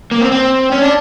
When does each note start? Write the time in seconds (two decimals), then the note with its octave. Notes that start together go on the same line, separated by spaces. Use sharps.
0.11 A#3
0.21 C4
0.32 C4
0.72 C#4
0.82 D4